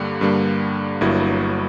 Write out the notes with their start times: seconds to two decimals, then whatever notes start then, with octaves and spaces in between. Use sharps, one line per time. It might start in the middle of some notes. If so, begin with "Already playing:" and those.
Already playing: G2 D3 G3 A#3
0.21 G2 D3 G3 A#3
1.01 G1 G2 F#3 A#3 E4